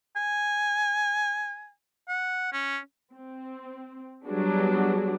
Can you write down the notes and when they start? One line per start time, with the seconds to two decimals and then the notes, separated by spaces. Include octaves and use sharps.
0.17 G#5
2.08 F#5
2.53 C#4
3.14 C4
4.27 F#3 G3 B3 D4 F#4 G#4